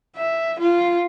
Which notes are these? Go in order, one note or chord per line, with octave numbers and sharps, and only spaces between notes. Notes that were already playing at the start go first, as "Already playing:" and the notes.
E5
F4